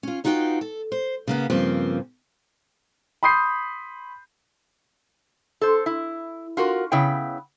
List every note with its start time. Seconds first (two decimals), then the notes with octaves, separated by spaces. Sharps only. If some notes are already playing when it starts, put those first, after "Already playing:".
0.03 C#4 F4
0.24 B3 D#4 F4 F#4 F#5 G5
0.61 A4
0.92 C5
1.27 C#3 A#3 B3
1.50 G2 C#3 F3 A#3 C4
3.23 B5 C6 D#6 G6 C7
5.61 A4 C5
5.86 E4
6.57 F4 F#4 A#4
6.92 C#3 B3 E4 G5